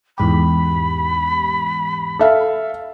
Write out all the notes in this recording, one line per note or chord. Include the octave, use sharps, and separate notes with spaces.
E2 G#2 G4 B5
A4 E5 F5